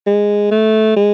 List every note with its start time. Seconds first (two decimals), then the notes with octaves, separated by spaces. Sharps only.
0.07 G#3
0.51 A3
0.96 G#3